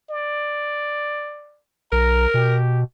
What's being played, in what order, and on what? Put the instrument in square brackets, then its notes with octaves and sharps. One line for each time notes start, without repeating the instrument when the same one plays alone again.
[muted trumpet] D5
[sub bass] B1 [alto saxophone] A#4 [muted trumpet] A#5
[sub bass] B2 [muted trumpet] G4